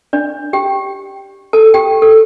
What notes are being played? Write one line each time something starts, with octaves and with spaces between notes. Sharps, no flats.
D4 D5
G4 G5
A4 A5
G4 G5
A4